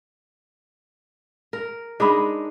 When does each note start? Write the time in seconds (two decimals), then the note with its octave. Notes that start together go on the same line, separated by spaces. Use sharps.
1.53 A#4
2.00 G#3 D4 D#4 D#5 B5